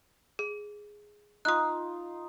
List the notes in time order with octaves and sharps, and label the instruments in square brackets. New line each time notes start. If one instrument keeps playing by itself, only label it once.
[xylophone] G#4
[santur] D#4 F4 [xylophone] D#6 F#6